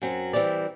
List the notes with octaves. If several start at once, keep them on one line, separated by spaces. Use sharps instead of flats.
F#2 F#3 C4
E3 G3 C4 G4 D5